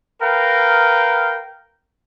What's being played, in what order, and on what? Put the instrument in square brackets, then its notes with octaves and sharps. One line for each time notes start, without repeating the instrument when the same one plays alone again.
[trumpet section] A#4 B4 F5 G5 A#5